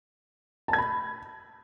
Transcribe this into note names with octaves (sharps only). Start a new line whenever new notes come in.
A5
G#6
B5